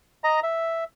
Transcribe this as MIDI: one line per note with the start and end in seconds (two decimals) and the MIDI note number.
0.24 0.40 75
0.24 0.40 82
0.43 0.84 76